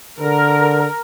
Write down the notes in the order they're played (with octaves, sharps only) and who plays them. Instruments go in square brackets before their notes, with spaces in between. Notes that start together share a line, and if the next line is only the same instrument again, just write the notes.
[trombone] D3 [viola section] A#4